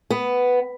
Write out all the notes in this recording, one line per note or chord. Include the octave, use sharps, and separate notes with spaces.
B3